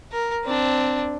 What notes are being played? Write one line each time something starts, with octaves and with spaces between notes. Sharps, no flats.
A#4
C4 D4